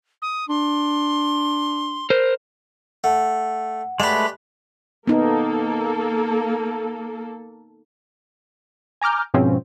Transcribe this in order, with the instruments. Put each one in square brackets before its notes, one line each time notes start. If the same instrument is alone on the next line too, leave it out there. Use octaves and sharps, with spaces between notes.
[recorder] D#6
[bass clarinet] D4 [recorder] C6
[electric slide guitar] A#4 C5
[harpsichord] A3 [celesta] F#5
[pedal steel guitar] G#3 A3 B4 [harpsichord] G4 D5
[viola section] A#3 A4 [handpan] B3 D#4
[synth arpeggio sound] G#5 A#5 D6 F6 G6
G#2 B2 F3 C4 C#4